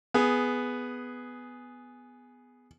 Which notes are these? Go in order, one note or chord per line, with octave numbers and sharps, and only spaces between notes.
B3 G#4